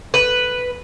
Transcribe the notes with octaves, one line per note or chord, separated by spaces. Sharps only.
B4